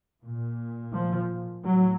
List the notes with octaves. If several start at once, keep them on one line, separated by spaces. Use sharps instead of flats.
A#2
F3
A2 F#3